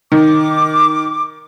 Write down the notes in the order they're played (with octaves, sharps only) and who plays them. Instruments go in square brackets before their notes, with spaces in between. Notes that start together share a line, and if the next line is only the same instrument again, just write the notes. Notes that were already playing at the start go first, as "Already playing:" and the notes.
[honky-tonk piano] D#3 [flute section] D6